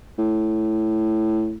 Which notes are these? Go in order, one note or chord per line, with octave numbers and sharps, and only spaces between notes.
A2